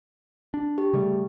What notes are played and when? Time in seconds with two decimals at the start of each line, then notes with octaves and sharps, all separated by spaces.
0.54 D4
0.78 G4
0.93 C#3 G3 A3